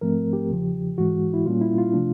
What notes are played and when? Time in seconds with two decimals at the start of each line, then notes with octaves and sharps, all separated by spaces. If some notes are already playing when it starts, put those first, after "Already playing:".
0.01 G#2 F3 A3 C4 A#4
0.33 G4
0.50 E2 C#3 F3
0.98 G#2 E3 G#3 F#4
1.34 E4
1.46 A#2 G3 A#3 C#4 F4
1.61 E4
1.78 F4
1.93 C3 F3 A3 D4